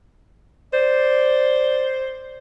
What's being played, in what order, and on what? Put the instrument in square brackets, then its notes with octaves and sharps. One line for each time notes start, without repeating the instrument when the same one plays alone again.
[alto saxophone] C5 [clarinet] D5